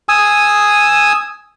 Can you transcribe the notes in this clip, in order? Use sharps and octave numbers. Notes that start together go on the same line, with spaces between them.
G#5 D#6 E6